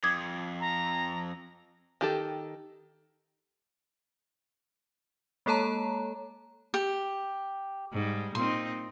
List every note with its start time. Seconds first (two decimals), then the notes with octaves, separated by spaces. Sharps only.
0.04 F2 D6 D#6 G#6
0.60 A#5
2.01 D#3 G4 A4
5.46 G#3 A#3 A4 C#5 A5 A#5
6.74 G4
7.93 G#2 G3
8.35 A#2 C4 D#4 C6